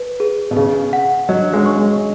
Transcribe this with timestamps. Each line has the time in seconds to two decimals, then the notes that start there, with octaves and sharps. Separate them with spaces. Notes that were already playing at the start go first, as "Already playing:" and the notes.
Already playing: B4
0.20 G#4
0.51 B2
0.57 C#3 G#4
0.93 F#5
1.29 F#3 D#5
1.53 G#3
1.66 C#6
1.77 G#3